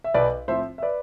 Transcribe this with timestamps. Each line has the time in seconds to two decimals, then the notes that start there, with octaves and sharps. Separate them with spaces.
0.04 E5
0.14 B1 B4 D5
0.48 A2 F3 C4 C5 E5
0.78 E5
0.82 B4 D5